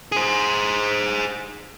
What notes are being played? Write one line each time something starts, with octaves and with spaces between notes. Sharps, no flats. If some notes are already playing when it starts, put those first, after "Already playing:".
G#4 C5